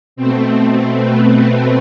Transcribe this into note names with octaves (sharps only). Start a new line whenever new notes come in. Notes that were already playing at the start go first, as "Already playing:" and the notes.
B2 A3 C4
B3